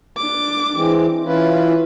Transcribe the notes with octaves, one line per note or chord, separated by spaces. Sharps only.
D4 D6
E3 G#3 C4
E3 C#4 E4 F4 B4